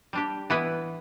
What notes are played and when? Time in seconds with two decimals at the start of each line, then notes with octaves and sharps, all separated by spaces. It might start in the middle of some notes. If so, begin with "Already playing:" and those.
0.13 G3 D4 G4
0.50 E3 B3 E4 B4